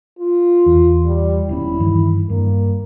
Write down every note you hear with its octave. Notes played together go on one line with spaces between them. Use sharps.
F4
E2
G3
D#1 B3 C#4 E4
G2 D#3 E3
G2 A#3